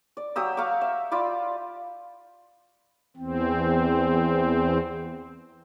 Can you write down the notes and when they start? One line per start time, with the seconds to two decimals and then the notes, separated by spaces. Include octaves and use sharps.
0.17 D5
0.36 F#3 G4 D#6 E6
0.57 F5 A#5 C#6 D6
0.81 E5
1.11 F4 D5 B5 D6
3.16 E2 C4